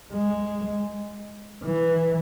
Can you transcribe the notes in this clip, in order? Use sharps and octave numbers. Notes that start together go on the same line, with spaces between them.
G#3
E3